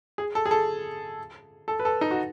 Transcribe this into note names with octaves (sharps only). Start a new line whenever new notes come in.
G#4
A4
G#4
A4
A4
B4
A4
D#4
F#4